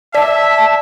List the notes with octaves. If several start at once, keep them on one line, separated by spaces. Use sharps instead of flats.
D5 E5 A5 B6